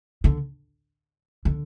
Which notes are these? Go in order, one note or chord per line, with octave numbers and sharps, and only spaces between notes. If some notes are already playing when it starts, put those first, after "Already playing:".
D3
D3